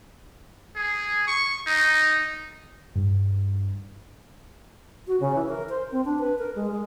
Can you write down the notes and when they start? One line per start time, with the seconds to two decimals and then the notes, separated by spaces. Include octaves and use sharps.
0.76 G#4
1.27 C#6
1.67 D#4
2.95 G2
5.08 F#4
5.20 C#3
5.35 E3
5.49 A#4
5.69 C5
5.92 C4
6.05 D4
6.19 B4
6.39 A#4
6.56 G#3
6.71 G#3